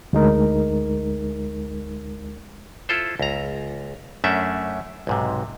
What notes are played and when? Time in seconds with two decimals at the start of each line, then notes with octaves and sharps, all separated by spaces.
0.13 D2 G#3 D#4 A#4
2.89 E4 F4 A4 C5
3.20 C#2 A#5
4.24 F#2 A3 C#4 D4 E5
5.07 B1 G#2 C3